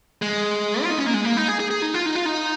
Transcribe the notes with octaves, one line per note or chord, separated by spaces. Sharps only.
G#3
F4
D#4
C#4
A#3
G#3
A#3
D#4
G#4
G#4
G#4
D#4
F4
D#4
F4
D#4